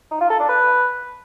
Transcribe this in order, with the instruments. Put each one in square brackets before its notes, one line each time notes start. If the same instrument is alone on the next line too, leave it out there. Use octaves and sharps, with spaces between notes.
[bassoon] D#4
F4
A4
D4
B4